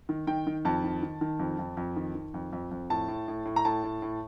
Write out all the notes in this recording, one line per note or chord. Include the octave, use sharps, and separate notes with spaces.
D#3
D#3 G5
D#3
F2 A5
D#3
D#3
D#3
F2
F2
F2
D#3
D#3
F2
F2
F2
A2 A5
A2
A2
A2
A#5
A2 A5
A2
A2